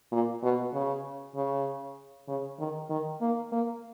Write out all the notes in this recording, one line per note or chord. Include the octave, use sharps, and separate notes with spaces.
A#2
B2
C#3
C#3
C#3
D#3
D#3
A#3
A#3